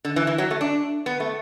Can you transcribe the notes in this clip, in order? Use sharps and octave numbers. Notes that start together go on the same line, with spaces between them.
D3
E3
E3
F#3
A3
D4
B3
A3